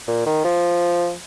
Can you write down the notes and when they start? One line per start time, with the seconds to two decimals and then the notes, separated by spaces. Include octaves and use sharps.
0.08 A#2
0.26 D#3
0.45 F3